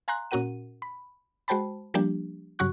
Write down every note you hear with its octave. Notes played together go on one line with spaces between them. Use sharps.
F5 G#5 A#5 C6 F#6
A#2 C#4 F#4 A#4 F#5 D#7
B5
G#3 F#4 C5 G5 A5 B5
F3 G3 A#3 D4 G4
G2 C#3 F#3 F#4 C#6 F#6